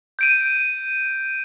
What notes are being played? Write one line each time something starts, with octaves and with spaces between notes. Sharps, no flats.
G6 D7 D#7